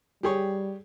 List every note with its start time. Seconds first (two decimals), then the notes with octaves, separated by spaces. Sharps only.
0.23 G3 G4 G#4 C#5